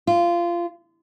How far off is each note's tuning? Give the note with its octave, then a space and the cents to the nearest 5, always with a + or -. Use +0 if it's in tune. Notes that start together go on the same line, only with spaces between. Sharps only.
F4 -20